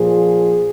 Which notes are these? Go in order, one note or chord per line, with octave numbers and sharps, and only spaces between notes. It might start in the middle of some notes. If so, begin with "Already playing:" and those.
Already playing: A#2 F3 G#4